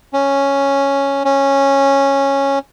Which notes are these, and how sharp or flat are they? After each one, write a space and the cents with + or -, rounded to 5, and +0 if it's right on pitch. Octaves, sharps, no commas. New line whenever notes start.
C#4 +0
C#4 -10